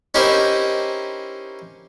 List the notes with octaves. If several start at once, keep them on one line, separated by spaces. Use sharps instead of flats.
C#4 D#4 E4 G4 A#4 C5